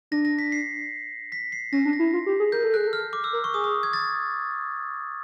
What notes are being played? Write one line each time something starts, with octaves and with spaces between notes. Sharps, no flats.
D4 A#6
A#6
B6
C7
B6
C7
C#4 A#6
D4
A#6
E4
F4
G4
G#4
A#4 G6
A4
G#4 F#6
A4
F6
D6
E6
A#4
C#6
G#4 D#6
D#6
G#6
A6